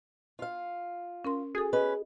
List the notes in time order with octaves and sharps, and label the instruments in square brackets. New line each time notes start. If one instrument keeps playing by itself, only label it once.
[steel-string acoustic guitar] F4 F5
[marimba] C#4 A#4 C6
[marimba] F#4 A4 [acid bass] G#4
[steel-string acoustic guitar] C#4 B4 [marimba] D#5